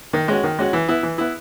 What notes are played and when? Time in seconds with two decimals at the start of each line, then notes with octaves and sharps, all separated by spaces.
0.13 D#3
0.28 G#3 C#4 F#4
0.44 D#3
0.59 G#3 C#4 F#4
0.73 E3
0.88 B3 E4
1.03 E3
1.18 B3 E4